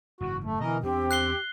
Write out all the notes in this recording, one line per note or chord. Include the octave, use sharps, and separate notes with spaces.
F#1 G#2 E3 F#4
A3
B2 D3 E3 A#4 D#5
E2 C4 D4 G4
F#6 C7 G7